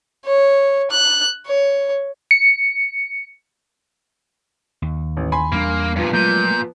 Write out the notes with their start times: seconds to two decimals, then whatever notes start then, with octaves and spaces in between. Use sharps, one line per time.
0.25 C#5
0.91 F#6
1.46 C#5
2.31 C#7
4.82 D#2
5.17 A1
5.32 G#5 B5 C6
5.52 E2 G3 A#3 D4
5.96 G2 A#2 F3 B3
6.13 A#2 F#3 G#3 A3 G6